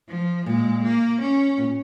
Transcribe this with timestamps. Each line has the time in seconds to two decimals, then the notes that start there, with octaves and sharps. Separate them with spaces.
0.09 F3
0.46 A#2 G#3
0.83 A#3
1.21 C#4
1.58 A#2